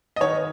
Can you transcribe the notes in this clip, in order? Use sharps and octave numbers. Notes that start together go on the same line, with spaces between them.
D#5
D#3 C#5